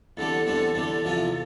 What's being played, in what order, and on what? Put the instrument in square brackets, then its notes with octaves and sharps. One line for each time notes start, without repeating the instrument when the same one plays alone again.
[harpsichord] E2 D3 G3 C4 [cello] A4
[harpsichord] E2 D3 G3 C4 [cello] A4
[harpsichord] E2 D3 G3 C4 [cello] A4
[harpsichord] E2 C3 F3 C4 F4